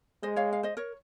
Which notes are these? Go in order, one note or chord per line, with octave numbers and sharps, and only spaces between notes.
G#3 C5 D#5
C#5 F5
F5
C5 D#5
A#4 C#5